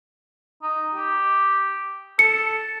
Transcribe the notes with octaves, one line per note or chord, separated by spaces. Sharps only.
D#4
G4
A4 C#7